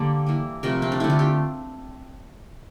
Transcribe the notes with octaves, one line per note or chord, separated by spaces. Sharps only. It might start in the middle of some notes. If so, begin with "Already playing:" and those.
Already playing: D3 G3 A#3 A4
E3 A#3
C3 F3 A3 A#4
C4
D4
D3 A3 E4
F4
G4